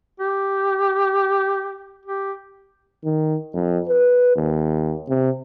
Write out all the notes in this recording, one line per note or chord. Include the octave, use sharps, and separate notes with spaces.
G4
G4
D#3
F2
B4
D#2
C3